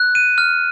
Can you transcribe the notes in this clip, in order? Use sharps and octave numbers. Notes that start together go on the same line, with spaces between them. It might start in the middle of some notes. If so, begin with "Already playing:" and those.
Already playing: F#6
D#7
F6